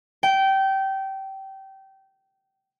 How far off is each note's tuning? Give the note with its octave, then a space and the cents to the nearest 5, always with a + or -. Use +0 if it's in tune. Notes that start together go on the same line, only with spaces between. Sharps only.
G5 -20